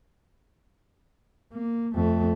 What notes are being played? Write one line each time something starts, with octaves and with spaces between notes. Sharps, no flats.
A#3
F2 A3